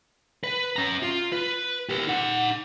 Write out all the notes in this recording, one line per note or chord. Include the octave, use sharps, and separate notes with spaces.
B4
C#4 A#5
F4
B4
G4 A#4
D#4 F#5